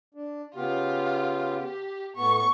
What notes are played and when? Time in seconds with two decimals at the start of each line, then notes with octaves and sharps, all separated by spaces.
0.14 D4
0.56 C#3 B3 F4 G4
1.63 G4
2.16 A2 B3 C#6